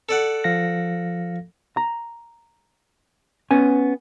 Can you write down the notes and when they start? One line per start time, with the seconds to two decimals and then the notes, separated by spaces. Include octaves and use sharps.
0.09 A4 D5 F#5
0.44 F3 F5 A#6
1.77 A#5
3.51 B3 C#4 G#5